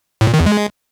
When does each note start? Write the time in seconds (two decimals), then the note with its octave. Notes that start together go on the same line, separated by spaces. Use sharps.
0.21 A2
0.27 A#2
0.34 D#3
0.40 E2
0.46 G#3